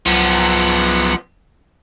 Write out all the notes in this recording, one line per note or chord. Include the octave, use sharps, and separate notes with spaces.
C2 F3 F#3 B3 A#5